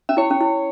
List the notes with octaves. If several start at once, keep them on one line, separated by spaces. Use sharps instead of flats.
C#4 E5
E4 C#5
C#4
E4